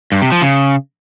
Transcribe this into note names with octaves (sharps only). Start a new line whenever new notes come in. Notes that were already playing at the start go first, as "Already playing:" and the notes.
G2
C3
F3
C#3